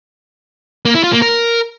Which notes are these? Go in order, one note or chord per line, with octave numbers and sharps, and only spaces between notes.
A#3
E4
F4
A#3
A#4